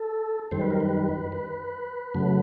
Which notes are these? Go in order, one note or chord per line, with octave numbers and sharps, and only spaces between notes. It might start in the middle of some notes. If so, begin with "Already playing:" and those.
Already playing: A4
F#2 D#3 G3 C5
B4
A#4
B4
B4
F#2 C#3 F#3 A3